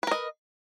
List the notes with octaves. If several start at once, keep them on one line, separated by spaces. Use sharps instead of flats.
A#4 B4 D#5